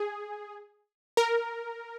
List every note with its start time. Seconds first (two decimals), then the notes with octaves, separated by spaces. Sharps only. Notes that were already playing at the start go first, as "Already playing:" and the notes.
Already playing: G#4
1.17 A#4